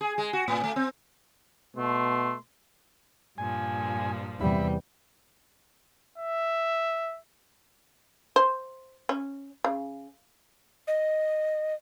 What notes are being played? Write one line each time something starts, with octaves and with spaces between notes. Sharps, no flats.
G#4
G#3
F#4
A2
A3
C4
B2 A3 C6
G2 A#2 F3 G#5
E2 C3 G3 E5 B5
E5
C5
C#4
C#3
D#5